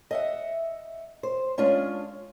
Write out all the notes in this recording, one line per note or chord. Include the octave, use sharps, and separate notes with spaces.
D#5 E5 F#5
C5
G#3 C#4 D4 F4